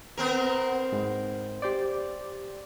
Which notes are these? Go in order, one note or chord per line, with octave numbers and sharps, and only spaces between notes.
B3 C4 A#4
G#2
G4 C5 D5